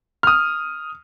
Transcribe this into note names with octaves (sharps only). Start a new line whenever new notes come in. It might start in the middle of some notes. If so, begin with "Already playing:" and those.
D#6 F6